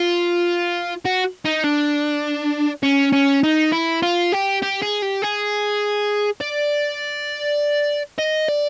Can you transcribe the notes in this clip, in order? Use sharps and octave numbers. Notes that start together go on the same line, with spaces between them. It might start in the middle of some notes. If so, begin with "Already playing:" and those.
Already playing: F4
F#4
D#4
D4
C#4
C#4
D#4
E4
F4
G4
G4
G#4
G4
G#4
D5
D#5
D5